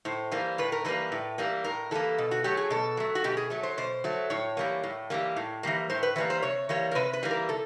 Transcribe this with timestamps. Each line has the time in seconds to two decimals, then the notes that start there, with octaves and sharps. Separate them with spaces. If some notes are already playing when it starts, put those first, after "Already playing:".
0.05 A2 C5
0.32 E3 G3 A#3
0.58 A2 B4
0.72 A#4
0.85 E3 G3 A#3 B4
1.12 A2
1.38 E3 G3 A#3
1.64 A2 A#4
1.91 E3 G3 A#3 A4
2.19 B2
2.31 F#4
2.44 F#3 A3 G4
2.57 G#4
2.70 B2 A4
2.97 F#3 A3
3.15 F#4
3.24 B2 G4
3.37 G#4
3.50 F#3 A3
3.63 C5
3.78 B2 C5
4.04 F#3 A3
4.30 A2 C#5
4.57 E3 G3 A#3
4.83 A2
5.10 E3 G3 A#3
5.36 A2
5.63 E3 G3 A#3
5.90 A2 C5
6.03 B4
6.16 E3 G3 A#3 B4
6.30 C5
6.42 C3 C#5
6.69 E3 G3 A#3 C#5
6.91 A#4
6.95 C3 B4
7.13 B4
7.23 E3 G3 A#3
7.31 A#4
7.49 C3 A4